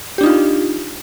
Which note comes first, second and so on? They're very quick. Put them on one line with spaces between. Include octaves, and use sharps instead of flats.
G4 D4 D#4 F4